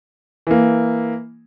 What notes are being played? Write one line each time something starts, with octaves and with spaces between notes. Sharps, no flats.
E3 A#3